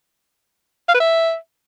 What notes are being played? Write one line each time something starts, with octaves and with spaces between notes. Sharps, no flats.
F5
B4
E5